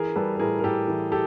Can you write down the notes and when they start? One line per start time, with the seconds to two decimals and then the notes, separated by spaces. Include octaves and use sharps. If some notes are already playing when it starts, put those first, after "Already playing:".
Already playing: E3 G#4 A#4
0.16 G3 A4 B4
0.35 B4
0.39 A2 G#4 A#4
0.59 A#4
0.64 A2 G4 A4
0.88 E3
1.12 G4 A4